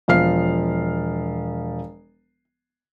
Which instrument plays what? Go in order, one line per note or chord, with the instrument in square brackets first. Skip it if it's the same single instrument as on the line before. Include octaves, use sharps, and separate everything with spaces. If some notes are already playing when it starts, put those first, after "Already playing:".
[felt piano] E1 F3 F5 F6 C7